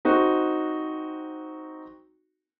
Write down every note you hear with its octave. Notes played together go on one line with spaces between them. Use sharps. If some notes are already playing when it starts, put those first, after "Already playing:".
C4 D#4 F#4